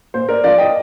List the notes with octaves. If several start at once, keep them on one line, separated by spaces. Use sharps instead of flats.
A#2 C5
A#4 D5
F3 D5 F5
D#5 G5